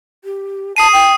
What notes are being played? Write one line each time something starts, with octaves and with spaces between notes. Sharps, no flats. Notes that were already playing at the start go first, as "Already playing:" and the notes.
G4
A5 D#6 C7 D#7
G5